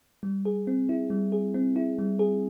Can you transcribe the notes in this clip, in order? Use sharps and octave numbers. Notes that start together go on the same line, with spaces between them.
G3
G#4
C4
E4
G3
G#4
C4
E4
G3
G#4